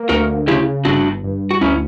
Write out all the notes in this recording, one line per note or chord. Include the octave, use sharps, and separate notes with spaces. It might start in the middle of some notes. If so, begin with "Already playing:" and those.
Already playing: A#3
D2 F#4 A#4
C#3 E4 G4
G1 D4 F#4
G2
F#4
D2 C#4 E4